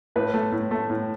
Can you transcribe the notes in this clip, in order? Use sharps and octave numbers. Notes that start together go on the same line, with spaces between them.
A2 B4
A3
A2
A3
A2